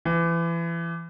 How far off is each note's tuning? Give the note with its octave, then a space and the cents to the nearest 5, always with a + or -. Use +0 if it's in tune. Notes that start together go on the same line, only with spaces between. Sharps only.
E3 +30